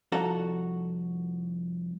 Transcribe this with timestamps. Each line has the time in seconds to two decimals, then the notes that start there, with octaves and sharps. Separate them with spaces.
0.12 C2 F2 F#4 A4 A#5